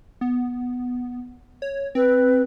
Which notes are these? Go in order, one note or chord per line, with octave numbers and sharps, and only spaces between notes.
B3
C#5
C4 B4